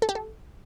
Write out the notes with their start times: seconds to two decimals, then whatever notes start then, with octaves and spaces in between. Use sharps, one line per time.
0.02 A4
0.09 G4
0.15 A4